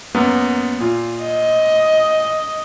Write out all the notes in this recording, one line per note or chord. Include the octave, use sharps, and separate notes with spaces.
F#2 A#3 B3
A#2 F4
D#5